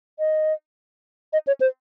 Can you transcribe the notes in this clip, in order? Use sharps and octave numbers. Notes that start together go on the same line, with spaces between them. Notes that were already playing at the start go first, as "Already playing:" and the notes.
D#5
D#5
C#5
C5